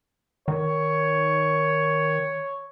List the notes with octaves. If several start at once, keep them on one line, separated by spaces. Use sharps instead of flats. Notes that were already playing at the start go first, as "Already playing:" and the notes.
D#3 C#5